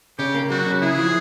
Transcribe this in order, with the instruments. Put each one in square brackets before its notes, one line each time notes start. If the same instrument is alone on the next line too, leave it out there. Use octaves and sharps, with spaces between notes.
[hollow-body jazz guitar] C#3 [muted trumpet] G4
[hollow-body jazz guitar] A#3
[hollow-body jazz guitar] F#3 [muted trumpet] F#4
[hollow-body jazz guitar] C#3
[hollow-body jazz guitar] E4 [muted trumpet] G#4
[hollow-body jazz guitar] F3